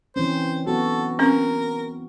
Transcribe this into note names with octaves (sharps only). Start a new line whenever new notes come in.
E3 C4 C#4 C5
B3 F#4 A4
C4 C#4 A#4